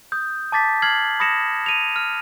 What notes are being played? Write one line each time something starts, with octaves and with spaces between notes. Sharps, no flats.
D#6 G6
A5 D6 A6 B6
F6 G#6 C7 F#7
B5 D#6 A#6 C#7 E7
D#7 F7
F6